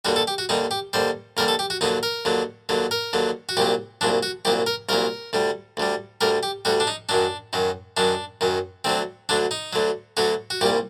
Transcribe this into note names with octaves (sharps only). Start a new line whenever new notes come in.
D#2 D3 G3 F#4
A4
G4
F#4
D#2 D3 G3 D#4
G4
D#2 D3 G3 C5
D#2 D3 G3 A#4
A4
G4
F#4
D#2 D3 F#3 D#4
A#4
D#2 D3 F#3
D#2 D3 F#3
A#4
D#2 D3 F#3
F#4
C2 A#2 F#3 G4
C2 A#2 F#3 D4
F#4
C2 A#2 F#3 G4
A#4
C2 A#2 F#3 A#4
D2 D3 G3
D2 D3 G3
D2 D3 G3 A#4
G4
D2 D3 G3 F#4
D4
D#4
F#2 D#3 F#3 D4
F#2 D#3 F#3
F#2 D#3 F#3 D4
F#2 D#3 F#3
D2 D3 F#3 C4
D2 D3 F#3 D4
D#4
D2 D3 F#3
D2 D3 F#3 F#4
F#4
C2 A#2 G3 G4